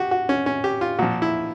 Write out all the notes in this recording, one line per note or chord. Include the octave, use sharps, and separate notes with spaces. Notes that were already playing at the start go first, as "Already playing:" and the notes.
Already playing: F#4 G4
F#4
C#4
C#4
G4
F4
A#2 F3 F#4
E4